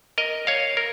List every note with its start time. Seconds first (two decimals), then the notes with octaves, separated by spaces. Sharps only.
0.18 A#4 D#5
0.47 C#5 F5
0.77 A#4